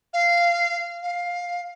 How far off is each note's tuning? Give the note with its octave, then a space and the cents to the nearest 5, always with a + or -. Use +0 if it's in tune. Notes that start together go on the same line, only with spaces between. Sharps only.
F5 -15
F5 +10